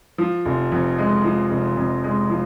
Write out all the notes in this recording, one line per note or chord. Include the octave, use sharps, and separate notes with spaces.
F3
F1
F2
G#3
F3
F1
F2
G#3
F3